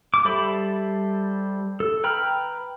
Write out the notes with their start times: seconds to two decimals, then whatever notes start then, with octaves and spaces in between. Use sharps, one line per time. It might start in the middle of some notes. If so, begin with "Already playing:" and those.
0.14 D6
0.25 G3 A4 C5 E5 B5
1.80 A4
2.04 B4 G5 A#5 B5 F6